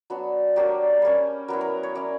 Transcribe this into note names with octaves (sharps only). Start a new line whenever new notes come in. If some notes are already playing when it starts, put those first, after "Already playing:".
F#3 B3 D4 F#4
F#3 A#3 D4 G4
G3 A#3 C#4
F#3 B3 E4 A#4
A#4
C#5
A#3 C#4 E4 D5